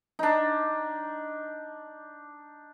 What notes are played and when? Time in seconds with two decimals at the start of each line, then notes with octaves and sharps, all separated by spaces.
0.19 D4 D#4